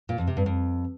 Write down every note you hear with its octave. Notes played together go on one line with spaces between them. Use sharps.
A#2
F2
C3
G2
F2